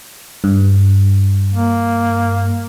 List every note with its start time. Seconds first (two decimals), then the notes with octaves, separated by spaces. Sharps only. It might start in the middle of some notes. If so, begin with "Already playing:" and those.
0.44 G2
1.54 A#3